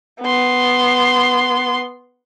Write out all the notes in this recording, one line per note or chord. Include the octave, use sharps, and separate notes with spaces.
B3 C6